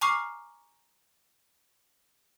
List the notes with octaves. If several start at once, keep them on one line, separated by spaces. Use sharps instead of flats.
G#5 A#5 C#6 D6 F6 C7